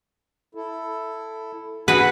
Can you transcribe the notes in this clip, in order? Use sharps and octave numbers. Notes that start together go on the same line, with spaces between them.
E4 A4
E3 F#4 G#4 B4 F#5